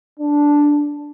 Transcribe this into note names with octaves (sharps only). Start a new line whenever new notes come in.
D4